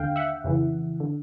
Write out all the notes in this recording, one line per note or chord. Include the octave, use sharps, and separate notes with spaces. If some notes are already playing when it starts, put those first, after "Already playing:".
Already playing: D#2 D3 F5 G5
E5 F#5
F2 C#3 E3
D3